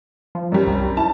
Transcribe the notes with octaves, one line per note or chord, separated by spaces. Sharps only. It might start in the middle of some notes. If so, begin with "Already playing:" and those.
F3
F#2 G3
C2
E4 A5